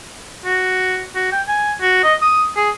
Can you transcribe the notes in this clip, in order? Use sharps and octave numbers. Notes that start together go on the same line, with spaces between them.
F#4
F#4
G5
G#5
F#4
D#5
D#6
G#4